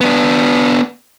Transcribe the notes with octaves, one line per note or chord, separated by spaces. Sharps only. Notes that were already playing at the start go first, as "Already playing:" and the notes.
B3 D4